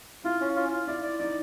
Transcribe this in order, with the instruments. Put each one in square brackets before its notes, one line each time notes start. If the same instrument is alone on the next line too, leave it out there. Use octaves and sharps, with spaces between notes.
[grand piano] E4 [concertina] F4
[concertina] C#4
F4
F4
[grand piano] E4 [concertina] D5
[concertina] D5
[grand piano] D#4 [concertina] D5